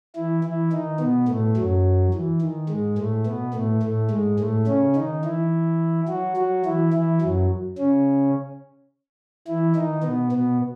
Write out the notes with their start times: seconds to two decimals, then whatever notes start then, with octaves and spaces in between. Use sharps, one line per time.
0.16 E3 E4
0.44 E3 E4
0.72 D#3 D#4
1.00 B2 B3
1.28 A2 A3
1.57 F#2 F#3
2.14 E3
2.41 D#3
2.69 G#2 G#3
2.98 A2 A3
3.26 B2 B3
3.54 A2 A3
3.83 A2 A3
4.11 G#2 G#3
4.39 A2 A3
4.67 C#3 C#4
4.96 D#3 D#4
5.24 E3 E4
6.09 F#3 F#4
6.37 F#3 F#4
6.65 E3 E4
6.93 E3 E4
7.22 F#2 F#3
7.78 C#3 C#4
9.48 E3 E4
9.76 D#3 D#4
10.04 B2 B3
10.32 B2 B3